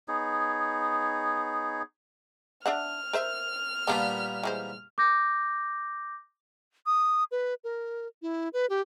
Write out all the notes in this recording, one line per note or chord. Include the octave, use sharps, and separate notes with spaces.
B3 D#4 G#4 C#5
D4 E5 F#5 F6
A#4 C5 E5
A#2 G3 A#3 B3 D4 F4
E3 G#3 C5
D6 G6 A#6
D#6
B4
A#4
E4
B4
G4